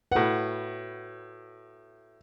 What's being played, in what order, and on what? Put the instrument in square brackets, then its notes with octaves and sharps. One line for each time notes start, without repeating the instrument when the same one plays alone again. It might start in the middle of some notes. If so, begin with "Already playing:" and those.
[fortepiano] A2 F#5 [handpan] F#4 B4